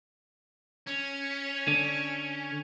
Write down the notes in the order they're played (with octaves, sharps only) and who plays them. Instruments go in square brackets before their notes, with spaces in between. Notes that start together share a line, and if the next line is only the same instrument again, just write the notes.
[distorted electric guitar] C#4
[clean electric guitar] D3